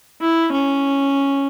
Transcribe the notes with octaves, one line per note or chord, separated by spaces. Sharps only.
E4
C#4